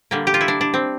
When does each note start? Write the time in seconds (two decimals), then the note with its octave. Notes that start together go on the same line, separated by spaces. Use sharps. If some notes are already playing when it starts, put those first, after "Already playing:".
0.11 D3 G3 A#3
0.27 G4
0.34 F4
0.41 E4
0.48 D4
0.61 D4
0.74 C4